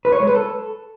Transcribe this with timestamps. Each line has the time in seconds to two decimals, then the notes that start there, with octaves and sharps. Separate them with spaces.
0.05 B4
0.12 C#5
0.20 G#3
0.27 B4
0.35 A4